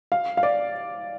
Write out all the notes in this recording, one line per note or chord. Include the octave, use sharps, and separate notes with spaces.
F5
F5
D5